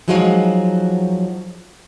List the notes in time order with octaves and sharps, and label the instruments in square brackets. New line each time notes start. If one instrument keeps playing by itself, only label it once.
[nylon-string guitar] F3 F#3 G#3 D#4 F4 F#4